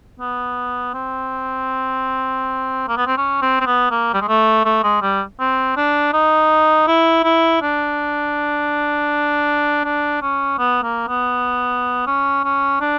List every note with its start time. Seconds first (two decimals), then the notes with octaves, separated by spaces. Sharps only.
0.20 B3
0.94 C4
2.88 A#3
2.97 B3
3.06 C4
3.17 C#4
3.42 C4
3.60 C4
3.66 B3
3.91 A#3
4.13 G3
4.21 G#3
4.28 A3
4.65 A3
4.83 G#3
5.02 G3
5.39 C4
5.77 D4
6.13 D#4
6.87 E4
7.24 E4
7.62 D4
9.84 D4
10.22 C#4
10.58 B3
10.83 A#3
11.08 B3
12.07 C#4
12.44 C#4
12.81 D4